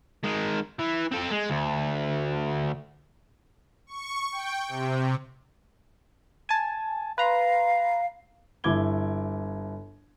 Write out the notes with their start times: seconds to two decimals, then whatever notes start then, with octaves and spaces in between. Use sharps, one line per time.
0.24 D#3 G#3
0.79 E3
1.11 C4 A4
1.31 G#3
1.50 D2
3.87 C#6
4.32 G5
4.68 C3
6.49 G#5 A5
7.18 B4 F5 A#5 C6
8.64 G1 E4 D6 G#6 G7